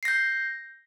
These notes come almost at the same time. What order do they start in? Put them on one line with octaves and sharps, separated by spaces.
C7 A#6 G6